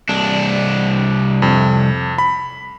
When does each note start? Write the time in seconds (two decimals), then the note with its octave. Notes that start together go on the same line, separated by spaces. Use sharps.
0.09 C2 D4
1.42 F2
2.18 B5